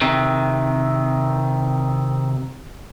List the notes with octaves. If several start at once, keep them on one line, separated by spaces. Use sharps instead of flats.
C3 D#3